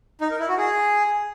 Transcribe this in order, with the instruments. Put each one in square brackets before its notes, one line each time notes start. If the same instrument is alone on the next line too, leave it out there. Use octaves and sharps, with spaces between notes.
[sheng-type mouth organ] D#4
A#4
E4
F#4
G#4